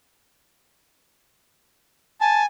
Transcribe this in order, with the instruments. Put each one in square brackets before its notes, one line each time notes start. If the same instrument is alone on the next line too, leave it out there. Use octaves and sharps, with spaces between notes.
[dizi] G#5 [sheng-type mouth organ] A5